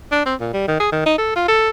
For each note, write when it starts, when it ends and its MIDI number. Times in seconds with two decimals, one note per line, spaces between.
0.12 0.22 62
0.26 0.35 60
0.40 0.51 46
0.54 0.68 55
0.68 0.76 51
0.80 0.88 68
0.92 1.04 51
1.06 1.14 63
1.18 1.34 69
1.36 1.46 65
1.48 1.70 69